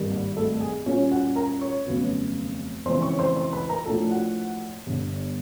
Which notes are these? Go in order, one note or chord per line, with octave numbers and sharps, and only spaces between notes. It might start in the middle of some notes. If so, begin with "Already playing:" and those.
Already playing: G#1 G2 D#3 G3
A#3 A#4
A3 A4
G#4
A#2 G3 A#3 C#4 F4 C#5
F#4 F#5
A#4 A#5
C#5 C#6
F1 D#2 C#3 F#3 B3
F2 C#3 E3 G#3 C5 C6
C#5 C#6
C5 C6
C5 C6
B4 B5
A#4 A#5
A2 F3 A#3 D4 F4 A4 A5
F#4 F#5
G1 G2 D3